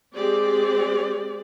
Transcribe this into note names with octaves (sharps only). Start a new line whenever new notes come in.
G#3 C4 G4 G#4 D5